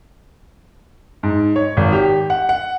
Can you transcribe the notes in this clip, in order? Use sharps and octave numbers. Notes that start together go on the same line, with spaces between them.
G#2
C#5
G#1
G4
F#5
F#5